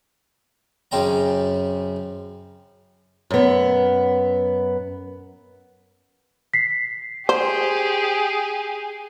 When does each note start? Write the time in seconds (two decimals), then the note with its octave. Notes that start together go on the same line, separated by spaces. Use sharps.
0.91 F#2 C#3 C4 G5 A#5
3.30 F#2 B3
6.54 B6 C7
7.29 G4 G#4 C5